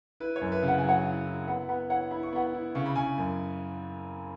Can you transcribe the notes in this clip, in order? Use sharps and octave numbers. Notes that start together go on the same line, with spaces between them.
E4 B4
C#5
F#2
B4 E5
C#3
F#5
G#5
F#3 C#5 F#5
E4
E4
B3 F#5 B5
B3 F#5 B5
E4 C#5 F#5
E4 B5
C#6
B3 F#5 B5
E4
C#3 C#6
B5
C#3 G#5 C#6
F#2